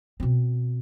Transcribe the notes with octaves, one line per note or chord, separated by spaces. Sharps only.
B2 C4